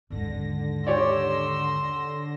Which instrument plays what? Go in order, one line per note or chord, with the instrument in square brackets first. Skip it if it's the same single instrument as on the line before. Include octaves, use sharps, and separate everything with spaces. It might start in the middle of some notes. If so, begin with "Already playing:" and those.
[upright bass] D#2 G#2 [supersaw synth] D3 A#6
[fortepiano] G4 C#5 D5 [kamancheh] C6 E6